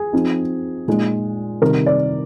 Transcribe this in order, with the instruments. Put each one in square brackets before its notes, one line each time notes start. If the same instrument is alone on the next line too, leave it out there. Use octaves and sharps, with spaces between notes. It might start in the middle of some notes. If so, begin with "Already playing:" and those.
Already playing: [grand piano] G#4
F3 C4 D#4
A#2 G#3 D#4
C3 D#3 G3 A#4
D5